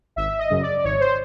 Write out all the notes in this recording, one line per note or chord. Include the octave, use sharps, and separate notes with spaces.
G#1 E5
D#5
F#2 C#3
D5
G#1 C#5
C5